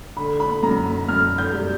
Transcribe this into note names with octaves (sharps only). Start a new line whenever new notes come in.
D3 B5
B5
F#2 A#5
B5
F#2 F6
G6
G3